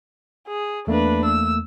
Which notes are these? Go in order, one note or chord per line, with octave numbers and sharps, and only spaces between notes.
G#4
E2 A3 A#3 D4 B4
E6